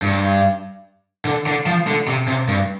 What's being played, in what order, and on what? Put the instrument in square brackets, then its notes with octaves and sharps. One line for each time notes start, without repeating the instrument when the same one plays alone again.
[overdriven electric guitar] G2
D3
D3
F3
D3
C3
C3
G2